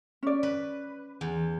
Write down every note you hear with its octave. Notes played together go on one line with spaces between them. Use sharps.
C#4 D5
B4
E2